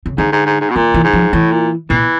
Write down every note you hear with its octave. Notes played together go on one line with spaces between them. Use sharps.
C#3
G#2 D3
G#2
G#2
G#2
B2
A#2 D#3
E3
G#2
F3
A2 E3
A#2
A#2 E3